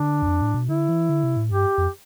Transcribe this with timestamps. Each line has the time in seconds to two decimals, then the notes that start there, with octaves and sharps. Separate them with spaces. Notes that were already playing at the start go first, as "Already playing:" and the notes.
Already playing: D3 D4
0.22 E2
0.27 F2
0.41 A2
0.54 B2
0.69 D3 E4
0.89 E3
1.09 D3
1.24 C3
1.37 A2
1.51 G2 G4
1.78 F2